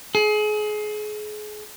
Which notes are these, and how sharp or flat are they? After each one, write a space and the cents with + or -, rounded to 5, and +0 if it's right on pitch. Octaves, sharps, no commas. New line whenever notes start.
G#4 +30